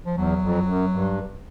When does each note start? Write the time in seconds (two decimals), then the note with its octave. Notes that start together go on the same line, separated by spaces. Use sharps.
0.06 F3
0.16 E2 F#3
0.42 F2
0.68 F#2
0.93 G2